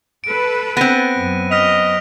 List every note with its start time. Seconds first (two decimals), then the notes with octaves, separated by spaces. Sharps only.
0.24 A4 B4 D7
0.77 B3 C4 F#6 A#6 D#7
1.15 F#2
1.51 D#5 F6 B6 F7